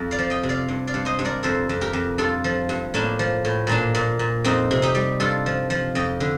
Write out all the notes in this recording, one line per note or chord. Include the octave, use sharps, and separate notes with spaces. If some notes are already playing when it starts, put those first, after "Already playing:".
Already playing: F2
D5 F5
F3
D#5 G5
C3
D5 F5
G2
D5 F5
G2
C5 D#5
G2
A#4 D5
F2 A4 C5
F2
G4 A#4
F2
G2 F4 A4
F3
G2
A2 A#3 D4
F3
A2
A#2 A#3 D4
A#2
A#2
F2 C4 D#4
C3
D#4 G4
G3
G2 F4 A4
F3
F3
F2 D#5 G5
D3